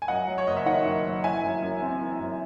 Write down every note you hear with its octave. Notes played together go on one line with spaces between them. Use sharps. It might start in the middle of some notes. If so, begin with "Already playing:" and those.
G#5
F#2 D#5 F#5
F#3
C#5
F#1 D#5
E5
D#3 D#5 F#5
F#2
F#3
E3 E5 G#5
F#2
F#2
C4
E3
F#2